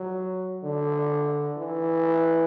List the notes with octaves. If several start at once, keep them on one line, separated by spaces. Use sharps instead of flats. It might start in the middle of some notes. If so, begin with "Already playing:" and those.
Already playing: F#3
D3
E3